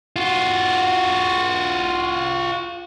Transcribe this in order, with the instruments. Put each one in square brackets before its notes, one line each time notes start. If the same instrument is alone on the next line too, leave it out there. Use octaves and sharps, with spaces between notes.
[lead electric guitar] F4 F#4